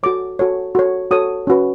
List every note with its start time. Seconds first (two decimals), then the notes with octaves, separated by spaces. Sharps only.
0.03 F#4 A4 C#5 D6
0.39 F#4 A4 C#5
0.75 F#4 A4 C#5
1.11 F#4 A4 C#5 D#6
1.47 C#4 F#4 B4